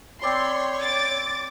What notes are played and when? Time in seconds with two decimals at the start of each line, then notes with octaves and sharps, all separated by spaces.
0.22 C4 C#5 D5 B5 C6
0.81 D6 A6